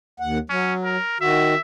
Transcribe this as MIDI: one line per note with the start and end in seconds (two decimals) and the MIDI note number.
0.20 0.38 39
0.20 0.38 78
0.50 0.97 54
0.50 0.74 61
0.84 1.19 70
1.21 1.54 51
1.21 1.54 66
1.21 1.60 76